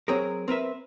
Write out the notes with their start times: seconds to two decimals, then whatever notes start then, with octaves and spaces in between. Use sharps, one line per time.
0.08 F#3 C4 G#4 A#4
0.48 C4 A#4 B4 E5